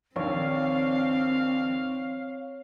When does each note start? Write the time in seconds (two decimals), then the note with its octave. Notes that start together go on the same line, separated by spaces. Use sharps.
0.16 A#1 D#2 C4 C#5 F5